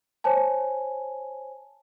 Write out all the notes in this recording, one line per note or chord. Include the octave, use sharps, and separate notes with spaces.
C5 C#5 G#5 A5